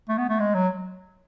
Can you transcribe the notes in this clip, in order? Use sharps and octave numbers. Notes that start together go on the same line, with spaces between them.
A3
B3
A3
G#3
F#3